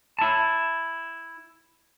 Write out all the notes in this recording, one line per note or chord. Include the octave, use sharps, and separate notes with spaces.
E4 A5